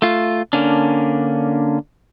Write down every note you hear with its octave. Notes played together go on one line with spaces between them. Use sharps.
A3 F4
D3 A#3 C#4 D4